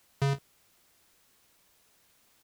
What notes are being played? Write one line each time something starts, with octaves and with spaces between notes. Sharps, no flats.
C#3